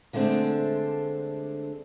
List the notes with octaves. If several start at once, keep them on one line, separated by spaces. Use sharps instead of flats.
D3 G#3 A3 C4 D4